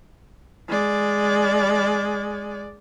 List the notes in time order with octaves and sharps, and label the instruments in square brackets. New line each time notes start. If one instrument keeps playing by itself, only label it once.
[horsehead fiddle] G#3 D5